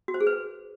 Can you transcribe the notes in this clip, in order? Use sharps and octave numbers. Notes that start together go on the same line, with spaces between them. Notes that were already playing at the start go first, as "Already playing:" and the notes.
F#4
C5
G#4
B4
A#4